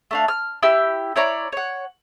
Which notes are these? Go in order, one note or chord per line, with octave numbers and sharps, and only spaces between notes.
A3 D4 F5
F6
E4 G4 E6
E4 C#5 D5 A#5
C#5 F#5